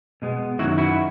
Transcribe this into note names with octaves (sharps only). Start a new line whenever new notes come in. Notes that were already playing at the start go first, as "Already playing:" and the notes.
B2 G#3 B3
F#2 D#3 F#3 E4 F#4
E4 F#4